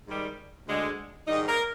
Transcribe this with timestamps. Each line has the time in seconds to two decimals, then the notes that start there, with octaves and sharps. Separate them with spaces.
0.07 G#2 D#3 G3
0.67 D2 D3 G#3
1.26 G#2 D#3 G3 D#4
1.47 A#4